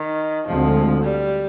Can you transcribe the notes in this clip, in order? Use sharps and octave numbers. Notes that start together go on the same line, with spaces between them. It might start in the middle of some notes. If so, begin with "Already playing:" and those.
Already playing: D#3
D2 D3 F3 G#3 C4
G3